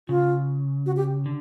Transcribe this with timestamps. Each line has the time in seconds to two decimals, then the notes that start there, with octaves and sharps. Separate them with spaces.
0.09 C#3 F4
0.86 F#4
0.97 G4
1.26 D3